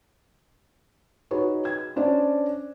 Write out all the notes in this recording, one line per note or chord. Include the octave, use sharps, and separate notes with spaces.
D#4 F#4 G#4 B4 C#5 D#5
G#6
C#4 D4 C5 D5